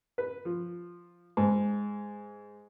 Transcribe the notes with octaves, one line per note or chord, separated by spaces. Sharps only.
B4
F3
G#2